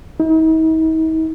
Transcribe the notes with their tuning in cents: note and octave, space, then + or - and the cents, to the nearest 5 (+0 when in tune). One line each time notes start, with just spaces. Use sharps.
D#4 +45